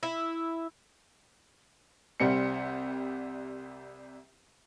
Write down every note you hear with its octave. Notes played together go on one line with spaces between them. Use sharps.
E4
C2 C3 G3 C4 C#7